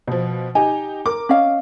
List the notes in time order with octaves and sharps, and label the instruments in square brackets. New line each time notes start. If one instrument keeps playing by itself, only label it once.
[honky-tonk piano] B2 F3
[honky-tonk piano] D#4 G4 [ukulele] G#5
[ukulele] A#4 [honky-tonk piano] D6
[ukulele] C#4 D#5 F5